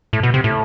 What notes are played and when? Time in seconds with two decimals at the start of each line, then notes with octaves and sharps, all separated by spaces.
0.13 A2
0.23 B2
0.34 C3
0.44 A2